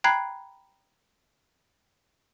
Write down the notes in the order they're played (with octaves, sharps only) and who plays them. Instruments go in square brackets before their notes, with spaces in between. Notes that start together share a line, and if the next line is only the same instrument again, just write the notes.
[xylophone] G5 A#5 B5 F#6 G#6 C7